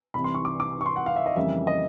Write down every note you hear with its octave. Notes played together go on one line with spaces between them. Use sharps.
C2 C3 E3 B5
C6
C#6
D6
D6
C#6
C6
F#5
F5
E5
D#5
F2 C#3 E3 G3 A#3 E5
D#5